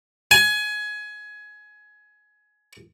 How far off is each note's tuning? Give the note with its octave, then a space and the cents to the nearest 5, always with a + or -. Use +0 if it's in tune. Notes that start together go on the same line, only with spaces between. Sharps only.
G#5 +20